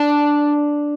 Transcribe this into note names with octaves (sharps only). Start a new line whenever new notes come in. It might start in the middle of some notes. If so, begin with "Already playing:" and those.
Already playing: D4